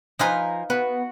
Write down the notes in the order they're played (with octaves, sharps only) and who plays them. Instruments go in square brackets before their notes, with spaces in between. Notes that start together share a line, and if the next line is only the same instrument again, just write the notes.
[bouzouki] F3 G#5 A#5 [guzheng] D#4 F4 B4
[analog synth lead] B3 [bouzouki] F#4 [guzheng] B4